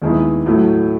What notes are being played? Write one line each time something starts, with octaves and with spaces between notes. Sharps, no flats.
D#2 D#3 G#3 B3 E4
A2 F#3 A3